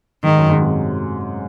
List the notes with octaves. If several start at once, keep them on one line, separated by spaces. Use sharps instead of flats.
G#2 D#3
F#2
G#2
C3